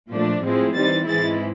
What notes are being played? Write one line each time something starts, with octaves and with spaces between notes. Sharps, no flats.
A#2 F3 A3 D4
A2 F3 G#3 C4 E4
E3 G3 C4 D#4 A6
G#2 E3 G#3 C4 E4 A6